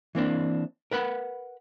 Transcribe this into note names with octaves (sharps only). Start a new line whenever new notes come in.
E3 A#3 C4 D4
A#4 B4 F#5 B5